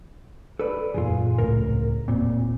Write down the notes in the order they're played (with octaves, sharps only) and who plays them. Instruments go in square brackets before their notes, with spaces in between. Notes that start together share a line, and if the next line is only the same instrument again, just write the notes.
[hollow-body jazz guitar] A4 B4 D5
[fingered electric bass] F#1 E2 A#2 [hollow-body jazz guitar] F4 G#4
[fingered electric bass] C#2 A2 [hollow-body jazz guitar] A#4
[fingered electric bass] E1 C4 [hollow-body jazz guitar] A#2